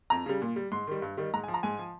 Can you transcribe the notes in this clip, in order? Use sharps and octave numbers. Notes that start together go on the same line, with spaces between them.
F2 A#5
C#3 G3
A#2
G3
G#2 C6
D#3 G3
G2
D#3 G3
G#2 A#5
G#5
F3
A#5
G#2 G#5
F3